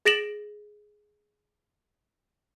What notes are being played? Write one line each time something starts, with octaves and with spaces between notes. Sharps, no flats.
G#4 A6 A#6 D7 E7 F#7